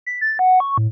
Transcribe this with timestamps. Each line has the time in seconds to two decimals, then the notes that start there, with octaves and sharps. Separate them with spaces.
0.06 B6
0.21 A6
0.39 F#5
0.60 C#6
0.78 A2